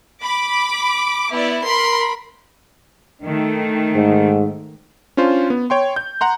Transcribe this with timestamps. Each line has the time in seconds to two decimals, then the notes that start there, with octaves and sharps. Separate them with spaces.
0.21 B5 D6
1.31 B3 E4 D5
1.64 A#4 B5 C6
3.24 D#3 A3
3.95 G#2
5.17 C#4 D4 F4 C5
5.50 B3
5.70 C#5 G5 C6
5.96 G6
6.21 F#5 A#5 C6